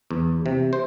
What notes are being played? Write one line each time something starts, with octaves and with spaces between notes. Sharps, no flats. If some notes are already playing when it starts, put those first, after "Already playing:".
E2
C3
C5